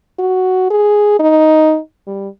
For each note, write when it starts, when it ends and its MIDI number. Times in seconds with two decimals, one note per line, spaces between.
0.19 0.66 66
0.71 1.15 68
1.19 1.79 63
2.07 2.28 55